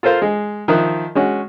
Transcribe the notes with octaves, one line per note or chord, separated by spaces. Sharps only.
F4 A4 A#4 C5 F5
G#3
D#3 F3 E5 F#6
G#3 C#4 F#4